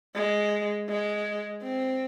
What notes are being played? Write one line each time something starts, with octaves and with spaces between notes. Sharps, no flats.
G#3
G#3
C4